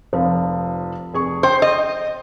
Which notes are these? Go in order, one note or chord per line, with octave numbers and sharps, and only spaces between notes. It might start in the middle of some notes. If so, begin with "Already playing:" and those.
F1 F3 F4
F1 G#4 C#6
C5 G5
D#5